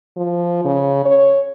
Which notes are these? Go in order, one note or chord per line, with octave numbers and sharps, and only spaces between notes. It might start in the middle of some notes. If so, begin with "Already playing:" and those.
F3
C#3
C#5